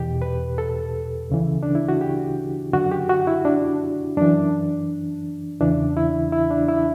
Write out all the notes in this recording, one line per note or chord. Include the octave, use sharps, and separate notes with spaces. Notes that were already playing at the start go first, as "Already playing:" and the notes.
Already playing: E2 B2 G4
B4
A4
D2 C#3 E3
D4
E4
F#4
G4
F#2 D3 F#4
G4
F#4
E4
D4
F#2 E3 D4
E2 C#3 E3 D4
E4
E4
D4
E4